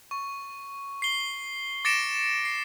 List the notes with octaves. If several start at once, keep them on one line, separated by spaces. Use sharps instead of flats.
C#6
C7 G7
D6 A6 A#6 C#7 D7 E7
C7